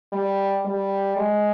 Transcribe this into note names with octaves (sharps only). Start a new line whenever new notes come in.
G3
G3
G#3